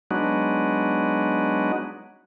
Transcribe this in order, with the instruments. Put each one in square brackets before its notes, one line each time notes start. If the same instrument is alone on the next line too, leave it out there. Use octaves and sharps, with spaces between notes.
[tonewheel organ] F#3 G#3 B3 D4 D#4 F#4